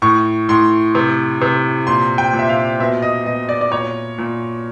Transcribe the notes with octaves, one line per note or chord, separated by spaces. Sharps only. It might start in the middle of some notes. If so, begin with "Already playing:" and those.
A2 C#6
A2 C6
C3
C3
A#2 C6
G5
A#2
E5
F5
B2 E5
D#5
B2 D#5
D5
D5
A#2 C#5
A#2